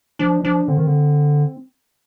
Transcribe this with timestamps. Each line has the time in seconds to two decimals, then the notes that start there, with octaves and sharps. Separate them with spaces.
0.19 F3 D4
0.43 F3 D4
0.68 D3 C4
0.77 D#3
0.87 D3